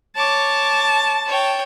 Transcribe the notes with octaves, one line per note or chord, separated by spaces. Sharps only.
C#5 A5 D6
C#5 G5